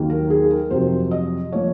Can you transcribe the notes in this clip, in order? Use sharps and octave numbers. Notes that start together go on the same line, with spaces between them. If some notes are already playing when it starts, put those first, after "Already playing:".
Already playing: D#2 D#3 F#3 A#3
A#4
G#4
A#4
F2 C3 F#3 C5
D#5
F3 A#3 C#5